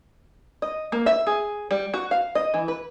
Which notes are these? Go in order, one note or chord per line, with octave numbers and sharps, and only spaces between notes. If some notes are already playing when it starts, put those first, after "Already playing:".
D#5
A#3
E5
G#4
G3
F#4
F5
D#5
E3
B4